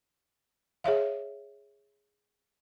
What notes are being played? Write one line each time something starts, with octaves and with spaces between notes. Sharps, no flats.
G#4 C#5 E5 F5